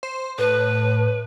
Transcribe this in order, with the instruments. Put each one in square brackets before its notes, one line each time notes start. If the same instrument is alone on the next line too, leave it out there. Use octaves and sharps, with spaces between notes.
[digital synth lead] C5
[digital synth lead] A2 [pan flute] B4